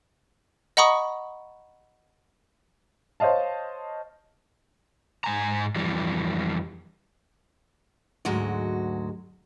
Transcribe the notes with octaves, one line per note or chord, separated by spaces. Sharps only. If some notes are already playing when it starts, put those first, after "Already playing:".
D#5 F#5 A#5 B5 C#6 D#6
C5 C#5 D#5 F5 A5
G#2 G#5 A#5
F2 E3 G3
D2 G#2 F#3 G#3 F#4